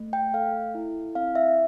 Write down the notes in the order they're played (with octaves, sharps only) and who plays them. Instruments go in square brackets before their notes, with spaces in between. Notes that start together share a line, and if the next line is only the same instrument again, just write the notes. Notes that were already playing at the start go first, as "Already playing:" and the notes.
Already playing: [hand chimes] A3
G5
A4 F5
E4
C4 F5
E5